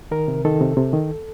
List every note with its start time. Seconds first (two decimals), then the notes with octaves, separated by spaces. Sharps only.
0.11 D#3 A#4
0.28 C3
0.45 D#3 A4
0.61 C3
0.77 C3
0.93 D#3